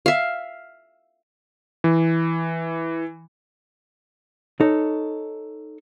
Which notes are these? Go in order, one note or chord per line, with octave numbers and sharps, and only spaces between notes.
E5 F5
E3
D#4 A4 C#5